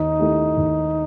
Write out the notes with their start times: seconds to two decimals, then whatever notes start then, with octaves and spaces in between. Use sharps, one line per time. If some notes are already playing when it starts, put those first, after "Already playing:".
Already playing: D#2 D#4
0.20 D#3 A3 E4 G4
0.57 D#2